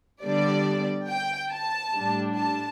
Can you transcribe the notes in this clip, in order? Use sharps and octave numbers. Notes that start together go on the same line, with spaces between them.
D3 G3 B3 D4 D5
G5
A5
A2 G3 D4
A5